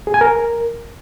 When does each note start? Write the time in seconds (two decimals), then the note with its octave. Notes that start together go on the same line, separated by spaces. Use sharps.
0.07 G#4
0.14 G#5
0.21 A#4